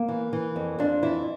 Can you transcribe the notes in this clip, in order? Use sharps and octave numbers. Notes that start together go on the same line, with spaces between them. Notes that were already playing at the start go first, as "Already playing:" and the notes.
Already playing: A#3
E3
E3
F2
F2 D4
E3 E4